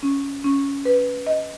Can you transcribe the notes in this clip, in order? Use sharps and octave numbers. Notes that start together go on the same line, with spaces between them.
C#4
C#4
B4
D#5